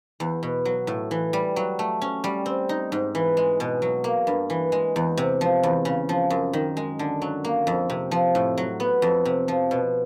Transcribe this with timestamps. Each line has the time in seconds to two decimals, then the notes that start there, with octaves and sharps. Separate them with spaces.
0.20 E2
0.43 B2
0.65 F#3
0.87 A2
1.11 E3
1.33 G3
1.56 F#3
1.79 A3
2.02 C#4
2.24 G3
2.46 C4
2.69 D#4
2.92 G#2
3.15 E3
3.37 G#3
3.60 B2
3.82 F#3
4.04 A#3
4.27 G2
4.50 E3
4.72 G#3
4.96 E2
5.17 C3
5.41 F3
5.63 E2
5.85 C#3
6.09 F3
6.30 F#2
6.53 D#3
6.77 G#3
6.99 D3
7.22 F#3
7.44 A#3
7.67 F2
7.90 C3
8.11 F3
8.35 A2
8.58 F#3
8.80 B3
9.02 F2
9.25 C3
9.48 F3
9.71 B2